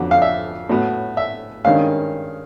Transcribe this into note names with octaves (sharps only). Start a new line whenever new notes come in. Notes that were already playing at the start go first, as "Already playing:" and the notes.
Already playing: F2 D3 F#3 B3
F5
E5
A2 F#3 B3
E5
G2 D#3 G#3 C#4 F5